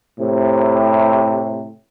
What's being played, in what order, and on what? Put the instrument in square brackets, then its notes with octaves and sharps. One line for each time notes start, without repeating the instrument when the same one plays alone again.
[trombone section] A2 C3